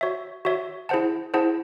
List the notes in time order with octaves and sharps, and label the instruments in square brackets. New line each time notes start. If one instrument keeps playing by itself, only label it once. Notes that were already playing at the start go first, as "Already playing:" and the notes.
[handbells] F#4 C#5 E5
F#4 C#5 E5
E4 G#4 C5 F#5 A5
E4 G#4 C5 F#5 A5